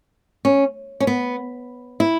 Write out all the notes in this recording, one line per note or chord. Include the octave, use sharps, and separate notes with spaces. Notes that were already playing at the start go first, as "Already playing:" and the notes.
C#4
C#4
B3
E4